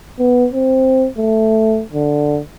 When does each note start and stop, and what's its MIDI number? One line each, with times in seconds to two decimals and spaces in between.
0.19 0.47 59
0.53 1.07 60
1.18 1.83 57
1.93 2.40 50